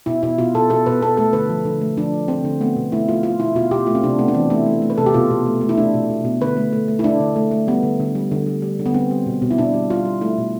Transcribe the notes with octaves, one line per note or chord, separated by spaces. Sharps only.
B2 E4
B2 E4
B2 F4
B2 A4
B2 A4
B2 B4
B2 A4
A3 A4
D3 B4
F3
D3
A3
F3 D4
F3
D3 C4
D3
A3 B3
B2
A3 E4
A3 F4
A3 F4
B2 E4
B2 F4
B2 G4
A3 F4
C4
C3 D4
A3 B3
D4
E3 C4
A3 E4
A3
A3
B4
C3 A4
G4
B2 F4
B2
A3
A3
E4
A3 D4
B2
B2
B2
D3 B4
A3
A3
A3
E4
A3 D4
D3
A3
A3
G3 B3
D3
D3
G3
D3
G3
G3
D3
B3
G3 C4
G3
B2
B2
E4
B2 D4
G3
G3 F4
G3
A3 E4
B2